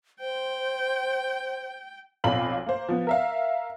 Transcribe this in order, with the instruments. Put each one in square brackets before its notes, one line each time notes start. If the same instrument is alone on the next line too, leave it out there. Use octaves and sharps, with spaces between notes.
[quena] C5 [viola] G5
[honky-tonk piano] B1 F2 F5 B5 F#7
A#3 C5
F3 B3
A#4 E5 F5